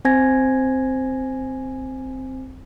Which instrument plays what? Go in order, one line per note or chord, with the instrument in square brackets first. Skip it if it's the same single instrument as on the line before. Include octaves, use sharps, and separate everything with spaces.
[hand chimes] C4 C5 G#5 G#6 A#6